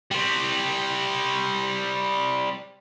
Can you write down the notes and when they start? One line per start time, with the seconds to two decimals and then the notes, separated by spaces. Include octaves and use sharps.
0.11 G3 C4